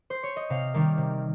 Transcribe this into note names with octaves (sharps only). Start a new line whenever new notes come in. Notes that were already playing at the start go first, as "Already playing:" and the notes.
Already playing: A#4
C5
C#5
D#5
C3 F5
D#3 G3 A#3
C3